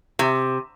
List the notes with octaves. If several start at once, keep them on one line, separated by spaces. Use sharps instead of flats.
C3